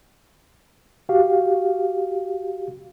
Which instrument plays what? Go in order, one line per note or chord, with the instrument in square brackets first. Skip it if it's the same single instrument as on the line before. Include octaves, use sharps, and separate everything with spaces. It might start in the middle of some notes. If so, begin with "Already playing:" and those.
[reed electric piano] F#4 G4 F5